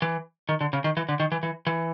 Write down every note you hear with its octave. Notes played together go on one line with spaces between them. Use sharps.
E3
D#3
D3
C#3
D#3
E3
D3
D#3
E3
E3
E3